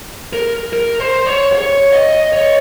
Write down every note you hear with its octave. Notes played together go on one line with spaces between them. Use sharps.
A#4
A#4
C5
C#5
C#5
D#5
C#5